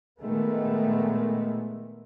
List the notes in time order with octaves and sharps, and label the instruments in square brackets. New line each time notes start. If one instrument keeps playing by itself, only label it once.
[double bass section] A#2 D#3 G#3 A3 B3